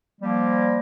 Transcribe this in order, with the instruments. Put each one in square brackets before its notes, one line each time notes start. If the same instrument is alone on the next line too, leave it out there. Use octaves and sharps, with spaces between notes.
[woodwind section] F3 G3 A#3